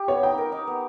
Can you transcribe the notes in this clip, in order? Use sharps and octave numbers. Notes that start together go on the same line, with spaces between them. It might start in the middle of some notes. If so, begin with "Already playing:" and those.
Already playing: G4
B3 C#5
D#4 G5
A#4
D#4
B3